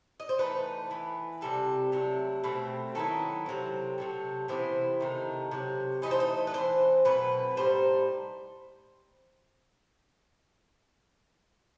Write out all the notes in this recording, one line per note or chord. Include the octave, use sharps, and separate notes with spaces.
D#5
C5
E3 A3 D#4 B4
E3 B3 E4
C3 D#3 G3 C4 A4
C3 F#3 A3 E4
B2 A3 C4
D#3 F#3 B3 E4 A4
C3 F#3 C4
C3 F#3 A3
C3 E3 B3 E4 C5
C3 D#3 A3 D#4
C3 D#3 F#3
E3 A3 D#4 D#5
C5
D#5
B4
E3 G3 C4 C5
B2 F#3 A3 C4 B4
A2 G3 D#4 C5